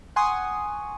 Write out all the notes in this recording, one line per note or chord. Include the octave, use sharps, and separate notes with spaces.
F#5 G#5 C6 C#6 D#6